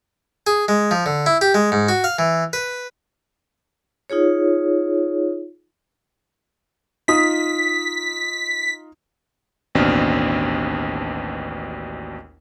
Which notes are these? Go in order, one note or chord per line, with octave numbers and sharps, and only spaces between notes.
G#4
G#3
F3
D3
E4
G4
G#3
G#2
F#4
F5
E3
B4
D#4 F4 G#4 C#5
D#4 F4 D#6 B6
A1 D#2 B2 C4 D4 F6